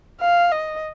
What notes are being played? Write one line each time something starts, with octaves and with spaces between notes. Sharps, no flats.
F5
D#5